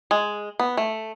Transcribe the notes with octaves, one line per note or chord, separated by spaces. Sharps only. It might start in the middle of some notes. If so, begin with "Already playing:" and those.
G#3
B3
A3